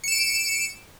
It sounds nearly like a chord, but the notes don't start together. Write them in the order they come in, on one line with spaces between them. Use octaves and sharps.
C#7 E7 D7